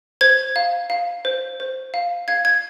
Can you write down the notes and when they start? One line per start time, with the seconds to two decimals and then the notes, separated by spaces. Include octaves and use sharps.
0.21 C5 G#6
0.56 F5
0.90 F5
1.25 C5
1.60 C5
1.94 F5
2.28 F5 G#6
2.45 G#6